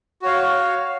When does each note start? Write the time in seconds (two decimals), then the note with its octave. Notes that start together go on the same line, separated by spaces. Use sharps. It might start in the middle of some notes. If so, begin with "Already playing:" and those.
0.22 F#4 C#5 F5